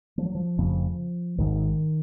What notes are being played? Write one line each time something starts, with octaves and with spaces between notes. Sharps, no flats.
F3
F#3
F3
F1 F2 C#3
G#1 G#2 D#3